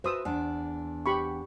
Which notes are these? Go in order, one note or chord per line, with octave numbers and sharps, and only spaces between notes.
F#4 B4 C5 E5 D#6 E6
E2 D4
G4 B5 C#6